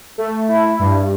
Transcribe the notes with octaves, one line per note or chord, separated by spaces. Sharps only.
A3
E4
G2